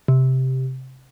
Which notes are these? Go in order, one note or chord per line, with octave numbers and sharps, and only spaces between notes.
C3